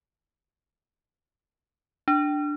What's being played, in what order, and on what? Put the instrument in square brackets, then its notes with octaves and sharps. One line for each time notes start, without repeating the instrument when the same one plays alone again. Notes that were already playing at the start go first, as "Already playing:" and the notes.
[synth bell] D4